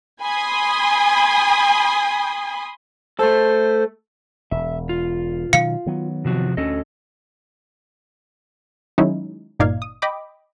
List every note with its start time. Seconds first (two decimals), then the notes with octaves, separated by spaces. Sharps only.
0.21 G#5 B5 C6 D#6
3.19 A3 A4 C5
4.51 E1 E5
4.89 F4
5.53 B2 D#3 F#3 F5 C#7
5.86 D#3 F#3 B3
6.25 C3 F3 F#4
6.57 D2 C#4 A4 D#5
8.98 D#3 F#3 G#3 C#4 D#4 E4
9.60 G1 A#2 D#4 D5 F5 G#6
9.82 D#6
10.02 D#5 G5 B5 D6